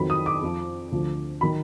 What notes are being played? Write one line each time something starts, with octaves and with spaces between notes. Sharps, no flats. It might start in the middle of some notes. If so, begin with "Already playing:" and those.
Already playing: F2 D#3 F#3 B5
D#6
D6
F2 F3
D2 D3 F3
D#3 F#3 B5